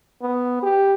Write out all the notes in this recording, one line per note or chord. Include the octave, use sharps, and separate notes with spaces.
B3
G4